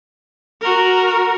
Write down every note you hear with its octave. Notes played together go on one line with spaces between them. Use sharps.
F#4 A#4